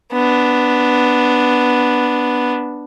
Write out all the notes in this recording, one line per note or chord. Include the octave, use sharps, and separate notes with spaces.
B3 D4